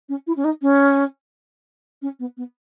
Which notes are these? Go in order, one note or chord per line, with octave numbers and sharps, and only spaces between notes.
C#4
E4
C#4
D#4
C#4
C#4
B3
B3